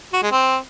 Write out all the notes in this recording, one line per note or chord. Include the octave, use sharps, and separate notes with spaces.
F#4
G#3
C4